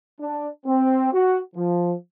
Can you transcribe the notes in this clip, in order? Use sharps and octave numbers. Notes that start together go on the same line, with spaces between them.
D4
C4
F#4
F3